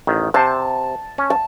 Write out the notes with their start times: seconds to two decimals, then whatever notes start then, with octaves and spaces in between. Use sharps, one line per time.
0.07 A1 D#3
0.34 C3 C5 A5
1.18 C#4
1.30 A5